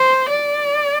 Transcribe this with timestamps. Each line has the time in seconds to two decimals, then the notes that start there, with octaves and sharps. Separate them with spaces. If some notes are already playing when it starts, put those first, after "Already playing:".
Already playing: C5
0.29 D5